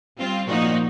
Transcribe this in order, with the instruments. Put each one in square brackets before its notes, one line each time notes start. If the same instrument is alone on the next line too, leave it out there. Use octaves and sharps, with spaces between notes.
[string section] G3 C4 F4
A#2 F3 A#3 D#4 F#4